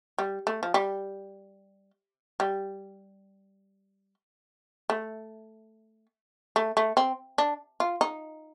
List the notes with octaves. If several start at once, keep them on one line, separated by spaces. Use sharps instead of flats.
G3
A3
F3
G3
G3
A3
A3
A3
C4
D4
F4
D#4